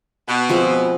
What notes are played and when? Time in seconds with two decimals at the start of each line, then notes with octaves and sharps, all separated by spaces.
0.28 B2
0.49 F3 G#3 C4